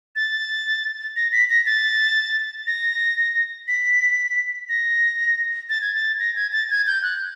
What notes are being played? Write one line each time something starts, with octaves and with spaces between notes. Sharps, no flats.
A6
A#6
B6
A#6
A6
A#6
B6
A#6
A6
G#6
A6
A#6
G#6
A6
G#6
G6
F#6